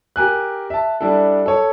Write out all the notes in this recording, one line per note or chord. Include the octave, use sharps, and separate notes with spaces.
G4 A#4 G#5 F#6
E5 A5
G3 D4 E4 A4
A4 C#5